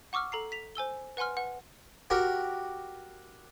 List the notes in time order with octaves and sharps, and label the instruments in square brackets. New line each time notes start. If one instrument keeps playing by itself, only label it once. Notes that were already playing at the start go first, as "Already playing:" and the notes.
[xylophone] F#5 C#6 D6 E6 F6
A4 A#5 C7
B6 F7
C5 G#5 E6 G7
B4 F#5 G#5 C6 F6
B4 F#5
[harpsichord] F#4 G4 A#4